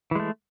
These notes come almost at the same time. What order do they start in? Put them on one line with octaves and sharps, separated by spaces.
E3 G#3 A3